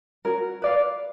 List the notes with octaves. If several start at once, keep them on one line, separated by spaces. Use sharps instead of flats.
C#4 F#4 A#4
B4 D5 F5